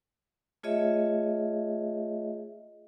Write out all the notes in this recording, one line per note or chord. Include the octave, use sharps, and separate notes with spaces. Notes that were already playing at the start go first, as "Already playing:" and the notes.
A3 F4 G#4 C#5 D#5 E5